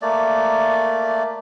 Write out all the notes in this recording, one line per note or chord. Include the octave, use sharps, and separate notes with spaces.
A3 A#3 D5